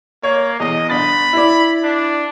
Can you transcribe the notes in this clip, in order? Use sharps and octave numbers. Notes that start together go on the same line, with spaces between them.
A#3 C#5
E2 D#5
G1 B5 A6
E4 D5
D4